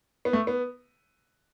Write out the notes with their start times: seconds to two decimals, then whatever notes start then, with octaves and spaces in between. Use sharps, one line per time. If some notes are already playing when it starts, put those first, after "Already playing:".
0.25 B3
0.33 A3
0.47 B3